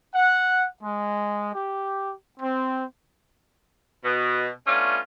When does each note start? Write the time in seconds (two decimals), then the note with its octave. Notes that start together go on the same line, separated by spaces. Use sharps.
0.15 F#5
0.82 G#3
1.53 G4
2.39 C4
4.05 B2
4.67 A3 B3 C#4 D4 F4